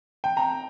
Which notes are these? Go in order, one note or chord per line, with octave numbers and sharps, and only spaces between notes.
G5
A#5